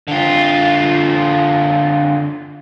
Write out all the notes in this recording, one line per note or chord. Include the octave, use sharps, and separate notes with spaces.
D3 F4